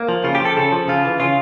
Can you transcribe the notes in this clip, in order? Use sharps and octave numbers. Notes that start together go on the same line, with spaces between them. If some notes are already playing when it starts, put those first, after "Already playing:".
Already playing: A#3
F3
C#3 F4
G4
F3 A4
C#3 A4
F3
C#3 F4
E3
C#3 F4